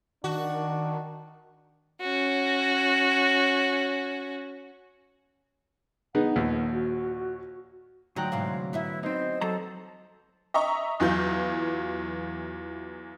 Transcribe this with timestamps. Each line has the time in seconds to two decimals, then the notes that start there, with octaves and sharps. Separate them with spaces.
0.24 D#3 D4 F#4
2.01 C#4 F#4
6.15 B3 D#4 G#4 F#5
6.36 A#1 D#2
6.73 F#4
8.16 D2 F#3 D#4 F4 G5 A#5 F#6
8.32 G#2 C3 E3 F5
8.73 B3 E4 B4 E5
9.03 C4 D#4 C5
9.41 F#3 A4 A#5
10.54 D#5 E5 A#5 C#6
11.00 E2 E3 F#3 F4 G6